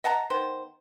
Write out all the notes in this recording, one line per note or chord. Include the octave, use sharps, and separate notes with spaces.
D#5 F#5 A5 A#5
D#3 B3 C5